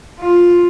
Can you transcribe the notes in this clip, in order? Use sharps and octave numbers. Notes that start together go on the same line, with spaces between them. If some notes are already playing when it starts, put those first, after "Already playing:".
F4